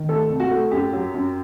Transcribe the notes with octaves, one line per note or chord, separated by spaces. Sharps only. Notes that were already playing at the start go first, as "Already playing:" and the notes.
Already playing: D#3
A3 A4
C2
F#4
A3
F#2 G4
F#3
F#2